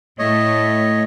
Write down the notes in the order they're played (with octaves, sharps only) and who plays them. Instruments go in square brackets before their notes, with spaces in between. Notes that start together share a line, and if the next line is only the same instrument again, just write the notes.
[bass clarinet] A2 [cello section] A3 [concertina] C#5 D#5